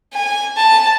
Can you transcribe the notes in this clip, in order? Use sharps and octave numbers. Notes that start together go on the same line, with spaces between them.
G#5
A5